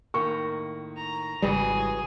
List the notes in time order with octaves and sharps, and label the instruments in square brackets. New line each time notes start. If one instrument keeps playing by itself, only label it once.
[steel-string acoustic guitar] A2 D#3 A#3 [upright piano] C#6
[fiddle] A#5
[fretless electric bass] G#1 G3 [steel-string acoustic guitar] C#3 E3 F#3 [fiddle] G#4